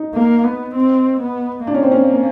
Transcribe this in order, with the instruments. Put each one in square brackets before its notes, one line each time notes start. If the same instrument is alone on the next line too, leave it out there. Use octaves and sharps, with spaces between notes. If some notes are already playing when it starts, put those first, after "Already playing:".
Already playing: [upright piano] D#4
[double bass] A#3
B3
C4
B3
[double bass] A#3 [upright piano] D4
[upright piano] C#4
C4
C#4